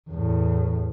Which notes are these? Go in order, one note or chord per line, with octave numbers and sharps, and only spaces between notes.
E2 A2